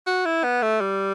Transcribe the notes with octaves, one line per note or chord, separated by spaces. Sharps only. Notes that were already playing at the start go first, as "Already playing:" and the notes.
F#4
E4
B3
A3
G3